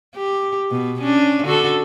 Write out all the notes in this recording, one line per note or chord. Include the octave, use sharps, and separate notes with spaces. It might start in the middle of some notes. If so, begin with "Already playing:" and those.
G4
B2
C#4 D4
D3 F#4 A4